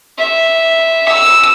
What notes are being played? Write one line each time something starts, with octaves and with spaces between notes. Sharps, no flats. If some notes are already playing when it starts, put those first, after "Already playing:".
E5
E6